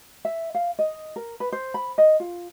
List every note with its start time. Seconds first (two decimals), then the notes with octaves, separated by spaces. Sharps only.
0.25 E5
0.55 F5
0.79 D#5
1.16 A#4
1.40 B4
1.52 C5
1.74 B5
1.98 D#5
2.20 F4